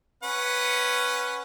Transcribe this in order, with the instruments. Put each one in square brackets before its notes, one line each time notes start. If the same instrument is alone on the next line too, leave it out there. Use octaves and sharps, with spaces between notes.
[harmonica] C#4 B4 F#5